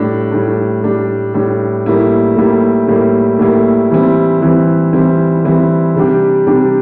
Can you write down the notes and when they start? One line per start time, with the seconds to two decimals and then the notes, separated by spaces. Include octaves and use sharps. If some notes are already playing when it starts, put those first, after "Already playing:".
Already playing: A2 G3 D4
0.32 A2 G3 D4
0.83 A2 G3 D4
1.34 A2 G3 D4
1.86 A2 G3 A#3 E4
2.37 A2 G3 A#3 E4
2.87 A2 G3 A#3 E4
3.39 A2 G3 A#3 E4
3.91 E3 G3 C4 E4
4.41 E3 G3 C4 E4
4.93 E3 G3 C4 E4
5.45 E3 G3 C4 E4
5.95 C3 G3 D4 G4
6.46 C3 G3 D4 G4